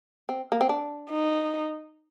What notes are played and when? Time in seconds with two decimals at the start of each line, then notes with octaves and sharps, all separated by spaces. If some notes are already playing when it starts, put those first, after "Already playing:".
0.29 C4
0.52 A#3
0.61 C4
0.69 D4
1.10 D#4